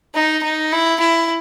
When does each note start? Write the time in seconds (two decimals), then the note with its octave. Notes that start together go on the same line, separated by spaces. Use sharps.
0.15 D#4
0.43 D#4
0.72 E4
1.00 E4